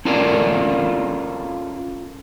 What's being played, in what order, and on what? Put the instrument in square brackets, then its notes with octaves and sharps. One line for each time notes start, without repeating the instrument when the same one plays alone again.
[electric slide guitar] C#4 E4 F4 A4 A#4 D5